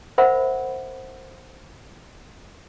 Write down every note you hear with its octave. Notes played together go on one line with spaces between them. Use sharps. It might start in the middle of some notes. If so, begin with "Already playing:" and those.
A#4 C5 E5 F#5 B5